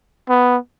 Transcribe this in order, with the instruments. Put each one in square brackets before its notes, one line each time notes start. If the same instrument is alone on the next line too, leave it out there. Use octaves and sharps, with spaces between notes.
[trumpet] B3